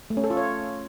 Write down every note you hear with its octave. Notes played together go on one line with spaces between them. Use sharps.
A3
C#4
A4
F4
C#5